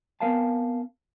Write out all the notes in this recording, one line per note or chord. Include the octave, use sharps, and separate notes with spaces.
B3 C4 A#4 F5 G#5 A5